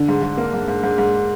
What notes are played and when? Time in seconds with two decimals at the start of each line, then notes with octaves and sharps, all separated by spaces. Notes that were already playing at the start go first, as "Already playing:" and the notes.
Already playing: D3
0.09 G#2
0.22 G#2
0.37 A#3
0.54 G#2
0.68 G#2
0.83 G#2
0.98 G#2